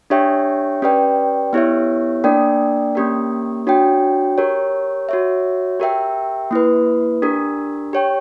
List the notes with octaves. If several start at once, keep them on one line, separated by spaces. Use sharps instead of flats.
D4 G4 C#5 E5 G5
C#4 G4 B4 D5 G5
B3 E4 G4 C#5 E5
A#3 D4 A#4 D5 G5
A#3 C#4 G4 A#4
D4 F#4 C#5 G5
G4 A#4 C#5
F#4 C#5 E5
G4 A#4 E5 G5
A#3 E4 B4
D4 G4 A#4
G4 C#5 G5